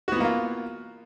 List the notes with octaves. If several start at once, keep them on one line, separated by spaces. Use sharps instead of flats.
E3 A#3 B3 F4 F#4